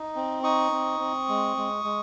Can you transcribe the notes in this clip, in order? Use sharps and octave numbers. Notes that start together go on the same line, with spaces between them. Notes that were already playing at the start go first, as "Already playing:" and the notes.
Already playing: D#4
C4
D#4 C#6 D#6
C4
C4
G#3
G#3
G#3